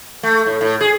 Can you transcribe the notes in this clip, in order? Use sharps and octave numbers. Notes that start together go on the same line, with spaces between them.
A3
A2
A2
G#4